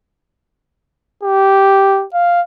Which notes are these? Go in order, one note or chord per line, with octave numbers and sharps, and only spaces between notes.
G4
F5